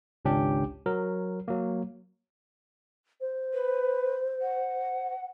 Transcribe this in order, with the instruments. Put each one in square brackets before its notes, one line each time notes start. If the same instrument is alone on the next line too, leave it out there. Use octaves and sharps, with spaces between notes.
[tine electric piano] G#1 C#2 C#4 D4 G4 G5
F#3 A#4
F#3 A#3
[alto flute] C5
[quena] B4
F#5